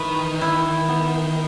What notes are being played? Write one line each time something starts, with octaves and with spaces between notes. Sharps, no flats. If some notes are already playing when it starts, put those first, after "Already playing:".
Already playing: D#3 E3 B4
E4
B3